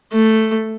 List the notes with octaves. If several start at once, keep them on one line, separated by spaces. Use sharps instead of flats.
A3